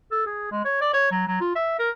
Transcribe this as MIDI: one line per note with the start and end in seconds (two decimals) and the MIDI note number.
0.11 0.24 69
0.26 0.51 68
0.51 0.63 56
0.64 0.78 73
0.81 0.92 74
0.93 1.10 73
1.11 1.26 54
1.27 1.39 54
1.41 1.53 65
1.55 1.78 76
1.79 1.90 70